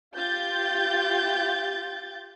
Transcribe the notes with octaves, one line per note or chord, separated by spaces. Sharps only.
F4 G4 G6 A6